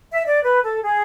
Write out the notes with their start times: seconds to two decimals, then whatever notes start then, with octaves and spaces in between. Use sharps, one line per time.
0.13 E5
0.25 D5
0.44 B4
0.63 A4
0.81 G#4